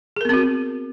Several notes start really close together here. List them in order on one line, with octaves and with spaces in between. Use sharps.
G#4 A#4 B3 C4 F#4